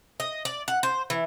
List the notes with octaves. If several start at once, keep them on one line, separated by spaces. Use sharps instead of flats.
D#5
D5
F#5
C5
E3